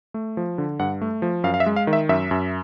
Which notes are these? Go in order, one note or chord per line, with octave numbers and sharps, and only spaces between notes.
A3
F3
D3
G2 F#5
A3
F3
F#2 F5
F5
E5
G#3
F5
D#3
E5
F#2 E5
F#2